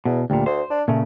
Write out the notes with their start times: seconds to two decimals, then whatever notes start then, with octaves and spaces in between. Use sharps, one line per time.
0.05 E2 B2
0.30 D2 A#2 G3
0.46 D2 C5
0.70 D4
0.88 A#2 C#3 A3